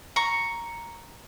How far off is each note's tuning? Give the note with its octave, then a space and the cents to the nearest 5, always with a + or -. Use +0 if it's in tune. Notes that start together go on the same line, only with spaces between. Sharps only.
A#5 +0 C#6 +0